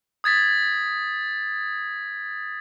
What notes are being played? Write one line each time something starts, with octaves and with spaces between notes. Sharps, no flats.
D#6 G#6 A6 B6